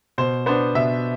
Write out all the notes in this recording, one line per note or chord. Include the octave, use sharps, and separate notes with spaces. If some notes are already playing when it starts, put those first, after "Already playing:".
B2 C5
B3 D4 C5
B2 E5